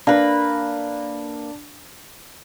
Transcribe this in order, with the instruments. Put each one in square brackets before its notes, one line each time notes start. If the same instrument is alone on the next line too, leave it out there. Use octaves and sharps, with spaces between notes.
[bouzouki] A#3 B4 [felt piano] D4